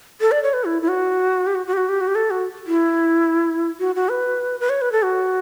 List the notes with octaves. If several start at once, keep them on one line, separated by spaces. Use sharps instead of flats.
A4
D5
C#5
B4
E4
E4
F#4
G4
F#4
F#4
G4
F#4
G4
F#4
G4
A4
F#4
E4
F#4
F#4
B4
B4
C#5
B4
A4
F#4